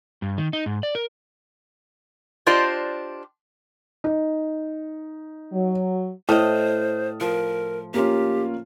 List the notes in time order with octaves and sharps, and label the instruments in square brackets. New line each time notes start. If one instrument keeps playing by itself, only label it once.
[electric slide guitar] G2
D#3
D#4
G#2
D5
A#4
[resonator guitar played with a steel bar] D4 F4 G4 C5 D5 D#5
[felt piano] D#4
[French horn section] F#3
[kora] A2 D#5 [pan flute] C5 [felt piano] A5 D#6 F6
[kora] F3 [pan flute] A#4
[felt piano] A#3 C#4 F4 [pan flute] G4